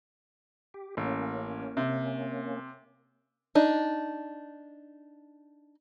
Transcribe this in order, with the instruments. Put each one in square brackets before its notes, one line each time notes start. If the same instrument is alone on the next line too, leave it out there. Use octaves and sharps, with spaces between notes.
[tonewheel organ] G4
[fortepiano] A1 [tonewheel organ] A#3 C#4
[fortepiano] C3
[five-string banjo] D4 D#4